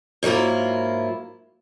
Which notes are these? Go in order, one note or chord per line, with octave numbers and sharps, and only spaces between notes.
G#2 F#3 A#3 E4 F4